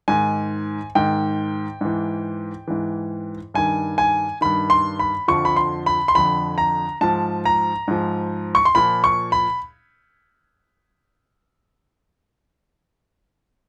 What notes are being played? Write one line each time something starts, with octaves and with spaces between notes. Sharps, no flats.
G#2 D#3 G#5
G#2 D#3 G5
G#2 E3
G#2 E3
G2 D#3 G#5
G#5
G2 D#3 B5
C6
B5
F2 D3 F3 C#6
B5
C6
B5
C6
F2 D3 F3 B5
A#5
G#2 F3 A5
A#5
G#2 F3
C#6
C6
A#2 F3 B5
C#6
B5